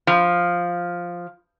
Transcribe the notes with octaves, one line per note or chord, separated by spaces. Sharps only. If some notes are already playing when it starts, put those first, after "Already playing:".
F3